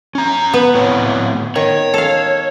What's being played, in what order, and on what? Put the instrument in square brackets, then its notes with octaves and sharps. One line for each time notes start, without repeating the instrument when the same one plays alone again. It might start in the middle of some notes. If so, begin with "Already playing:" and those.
[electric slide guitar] C#4 A#5
[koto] B3 [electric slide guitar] B4
[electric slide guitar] A2 C4 C#5
[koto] D#3 [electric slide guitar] C#5
[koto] A4 F5